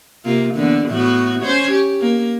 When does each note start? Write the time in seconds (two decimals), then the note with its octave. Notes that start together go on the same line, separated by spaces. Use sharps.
0.25 C3 A#3 F4
0.54 E2 D3 A#3
0.89 A2 B3 F#4
1.42 C#4 C5 C#5
1.72 G4
2.01 A#3